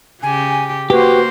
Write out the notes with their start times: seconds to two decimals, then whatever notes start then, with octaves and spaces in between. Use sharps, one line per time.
0.23 C#3 G4 G#5
0.90 A#3 F#4 G4 B4 C5